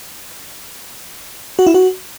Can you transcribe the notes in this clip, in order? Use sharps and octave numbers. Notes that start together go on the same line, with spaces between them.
F#4
E4
F#4